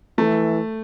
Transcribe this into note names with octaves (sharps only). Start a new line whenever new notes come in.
E3 A3